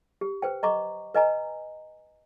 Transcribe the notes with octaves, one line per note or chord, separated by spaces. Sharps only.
G4
B4 C5 G5
D#5 A#5 C#6 D6
B4 D#5 G#5 A#5